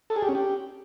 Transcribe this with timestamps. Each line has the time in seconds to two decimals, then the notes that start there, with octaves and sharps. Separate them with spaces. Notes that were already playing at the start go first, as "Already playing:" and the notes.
0.10 A4
0.16 G#4
0.22 G4
0.29 C#4
0.35 G4